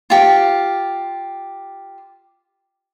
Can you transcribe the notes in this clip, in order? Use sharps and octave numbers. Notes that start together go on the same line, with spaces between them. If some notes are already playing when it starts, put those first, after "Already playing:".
F4 G4